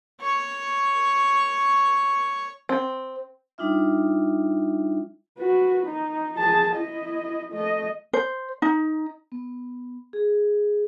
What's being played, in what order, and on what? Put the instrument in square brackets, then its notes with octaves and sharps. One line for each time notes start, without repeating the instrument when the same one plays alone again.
[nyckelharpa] C#5 C#6
[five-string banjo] C4
[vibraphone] G3 D4 D#4 F4 E5
[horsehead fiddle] F#4 B4
D#4
G#4 A5
E4 D#5
A3 D#5
[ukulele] C5
D#4
[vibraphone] B3
G#4